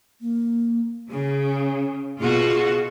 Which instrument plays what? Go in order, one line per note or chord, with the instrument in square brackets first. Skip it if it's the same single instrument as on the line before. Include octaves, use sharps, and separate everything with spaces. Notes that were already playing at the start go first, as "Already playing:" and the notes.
[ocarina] A#3
[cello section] C#3 [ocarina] C#4
[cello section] B2 F4 F#4 [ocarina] G#4